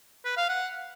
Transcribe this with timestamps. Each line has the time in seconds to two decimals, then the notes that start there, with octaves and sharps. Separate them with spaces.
0.25 B4
0.37 F5
0.49 F#5